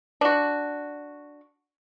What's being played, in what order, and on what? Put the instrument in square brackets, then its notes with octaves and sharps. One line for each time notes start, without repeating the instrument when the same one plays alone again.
[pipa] D4 F#4